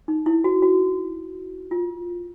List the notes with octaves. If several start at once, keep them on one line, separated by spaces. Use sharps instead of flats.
D#4
E4
F#4
F#4
F4